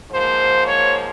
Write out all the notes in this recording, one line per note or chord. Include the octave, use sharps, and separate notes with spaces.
G#2 F3 A#3 C5
C#5